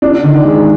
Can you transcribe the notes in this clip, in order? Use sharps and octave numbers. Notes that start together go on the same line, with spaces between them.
D4
D#3
G#3